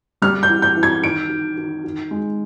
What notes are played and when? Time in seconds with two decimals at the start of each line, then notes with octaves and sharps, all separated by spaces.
0.22 G3 F6
0.43 G6
0.49 E3
0.62 G6
0.76 E3
0.83 G#6
1.03 D#3 D7
1.30 D#3
1.58 D#3
1.84 D#3
2.11 G#3